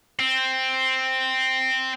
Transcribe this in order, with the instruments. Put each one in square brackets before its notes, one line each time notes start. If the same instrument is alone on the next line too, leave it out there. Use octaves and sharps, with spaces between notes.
[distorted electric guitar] C4